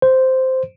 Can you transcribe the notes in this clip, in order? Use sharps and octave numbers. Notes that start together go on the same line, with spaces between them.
C5